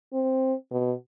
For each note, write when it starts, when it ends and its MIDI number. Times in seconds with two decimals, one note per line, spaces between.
0.13 0.54 60
0.71 0.93 47